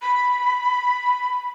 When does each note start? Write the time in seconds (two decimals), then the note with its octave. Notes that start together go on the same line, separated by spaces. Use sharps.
0.02 B5